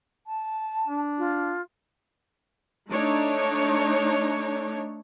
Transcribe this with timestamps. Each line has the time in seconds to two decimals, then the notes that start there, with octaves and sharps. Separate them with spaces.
0.26 A5
0.88 D4
1.18 F4
2.91 A3 D4 D#4 C#5